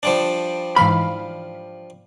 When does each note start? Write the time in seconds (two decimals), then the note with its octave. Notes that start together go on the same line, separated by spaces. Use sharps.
0.03 F3 G3 D4
0.76 G#2 E3 F5 B5